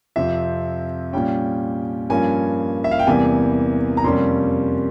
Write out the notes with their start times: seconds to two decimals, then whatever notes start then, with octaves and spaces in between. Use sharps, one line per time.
0.16 F2 C3 F3 C4 E5
1.13 A#2 G3 C#4 G5
2.10 G2 F3 A#3 C#4 G#5
2.84 E5
2.91 F5
2.99 G5
3.07 E2 C3 E3 G3 A#3 G#5
3.97 A#5
4.04 F2 C3 G3 A#3 C#4 C6